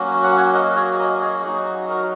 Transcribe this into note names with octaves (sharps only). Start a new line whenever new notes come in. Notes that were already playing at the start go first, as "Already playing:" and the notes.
Already playing: F#3 A#3 C#4 F#4
F#5
C#5 F#5
A#4 D#5
G#4 C#5
A#4 D#5
D#5
G#4 C#5
F#3 D#4 F#4 G#4
F#4 A#4